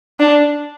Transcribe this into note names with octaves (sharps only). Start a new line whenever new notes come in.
D4